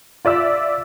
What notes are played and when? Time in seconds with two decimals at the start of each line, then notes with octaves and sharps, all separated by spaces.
0.25 F4 D5 E5 E6